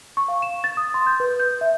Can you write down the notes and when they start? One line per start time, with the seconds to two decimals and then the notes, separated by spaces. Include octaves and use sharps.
0.17 C#6
0.28 F5
0.42 E7
0.64 A6
0.77 D#6
0.94 C6
1.07 G6
1.20 B4
1.39 G6
1.61 E5